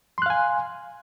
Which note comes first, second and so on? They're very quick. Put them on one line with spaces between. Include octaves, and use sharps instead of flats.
C6 F#6 F5 G#5